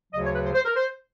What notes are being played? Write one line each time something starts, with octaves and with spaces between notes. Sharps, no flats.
D2 C#3 F#3 D#5
C#5
B4
C5
C5
A#4
C5